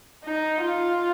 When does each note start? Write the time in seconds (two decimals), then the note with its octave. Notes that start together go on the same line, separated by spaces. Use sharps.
0.25 D#4
0.61 F4